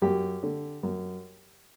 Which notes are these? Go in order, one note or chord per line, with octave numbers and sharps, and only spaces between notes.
F#2 G4
D3
F#2